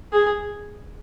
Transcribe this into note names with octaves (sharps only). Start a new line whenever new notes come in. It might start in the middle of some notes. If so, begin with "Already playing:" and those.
G#4